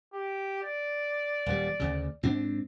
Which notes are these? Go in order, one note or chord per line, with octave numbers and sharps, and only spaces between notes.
G4
D5
D#1 G3
D2 C#3
G#2 C4 D4